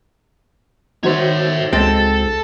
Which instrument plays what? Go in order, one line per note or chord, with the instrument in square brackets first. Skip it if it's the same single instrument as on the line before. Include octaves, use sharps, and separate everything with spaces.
[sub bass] D#3 [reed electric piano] D#4 F#4 C5 [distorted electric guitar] C#5 E5
[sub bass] C#2 [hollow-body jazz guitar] G#3 C4 [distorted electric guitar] A4